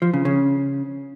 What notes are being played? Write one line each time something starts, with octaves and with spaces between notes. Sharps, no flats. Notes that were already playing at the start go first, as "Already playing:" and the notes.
F3
C#3
C#3